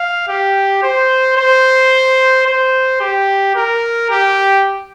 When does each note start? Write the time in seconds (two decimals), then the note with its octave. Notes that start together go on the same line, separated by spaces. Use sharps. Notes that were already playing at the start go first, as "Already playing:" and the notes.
Already playing: F5
0.28 G4
0.82 C5
1.37 C5
2.46 C5
3.00 G4
3.55 A#4
4.10 G4